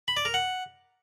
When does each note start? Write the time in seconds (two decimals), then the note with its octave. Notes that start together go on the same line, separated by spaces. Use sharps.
0.08 B5
0.17 D5
0.25 A#4
0.34 F#5